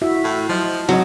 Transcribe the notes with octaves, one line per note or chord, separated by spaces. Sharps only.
E4 F#4 E5
A2
F3 F#3 D#5
G#2 F#3 C4 D#5